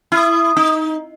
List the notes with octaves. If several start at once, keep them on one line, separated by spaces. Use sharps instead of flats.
E4 F6
D#6
D#4